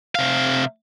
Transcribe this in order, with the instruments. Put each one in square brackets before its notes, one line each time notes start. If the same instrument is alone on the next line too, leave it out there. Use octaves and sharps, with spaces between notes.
[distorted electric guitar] C3 F5